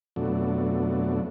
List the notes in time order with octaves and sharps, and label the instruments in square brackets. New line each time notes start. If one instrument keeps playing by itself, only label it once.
[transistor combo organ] F2 B2 F#3 A3 D4